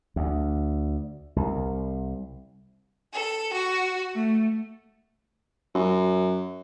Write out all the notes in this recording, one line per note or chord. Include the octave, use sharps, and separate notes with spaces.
D2
C2
A4
F#4
A3
F#2